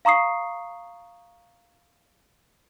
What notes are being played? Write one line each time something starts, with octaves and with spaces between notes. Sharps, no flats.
F5 A#5 C#6 D#6 C7